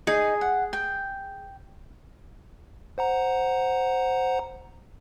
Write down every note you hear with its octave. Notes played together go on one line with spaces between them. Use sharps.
D#4 G#4
F#5
G5
C5 F#5 A#5